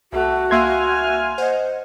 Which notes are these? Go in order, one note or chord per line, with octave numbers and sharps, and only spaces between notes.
C2 A3 F#4
C2 A#3 E5 F5 G#5 C6 F6 G#6
C5 D#5 F#5